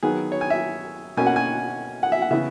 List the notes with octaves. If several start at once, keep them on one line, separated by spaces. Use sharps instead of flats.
D#3 F#3 B3 G#4
C#5
G#5
E5
B2 A#3 C#4 G#5
F#5
G#5
F#5
E5
F#5
C#3 E3 B3 E5